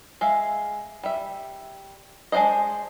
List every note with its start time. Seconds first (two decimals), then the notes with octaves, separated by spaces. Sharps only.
0.21 G#3 E5 F5
1.03 G3 E5
2.32 G#3 D4 F4 C5 D#5